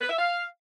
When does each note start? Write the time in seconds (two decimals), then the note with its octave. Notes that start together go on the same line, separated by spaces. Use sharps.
0.01 B4
0.09 E5
0.18 F5